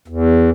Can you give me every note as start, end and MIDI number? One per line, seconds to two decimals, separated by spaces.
0.08 0.50 40